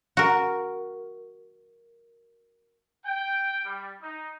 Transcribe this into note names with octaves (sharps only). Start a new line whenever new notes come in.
F#4 A#4
G5
G3
D#4